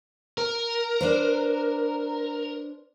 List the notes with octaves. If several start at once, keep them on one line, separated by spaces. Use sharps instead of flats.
A#4
D4 B4 C5